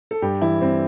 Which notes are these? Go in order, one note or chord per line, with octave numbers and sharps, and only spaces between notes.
A4
G2 G4
E3 E4
G2 C4